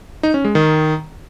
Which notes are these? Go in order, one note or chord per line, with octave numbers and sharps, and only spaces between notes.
D#4
C#4
G#3
D#3